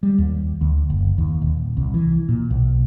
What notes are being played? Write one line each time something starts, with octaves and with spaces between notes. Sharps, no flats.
G3
D#2
D2
F#1
D#2
D#1
C2
E3
A#2
B1